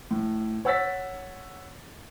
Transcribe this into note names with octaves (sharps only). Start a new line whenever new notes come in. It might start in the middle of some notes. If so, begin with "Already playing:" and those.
A2
C#5 F#5 E6 A6 B6